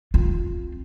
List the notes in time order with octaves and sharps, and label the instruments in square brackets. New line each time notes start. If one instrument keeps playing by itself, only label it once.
[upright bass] C4 F4